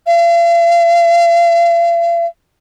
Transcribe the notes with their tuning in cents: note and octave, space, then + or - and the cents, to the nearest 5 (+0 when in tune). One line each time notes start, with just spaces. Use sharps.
F5 -40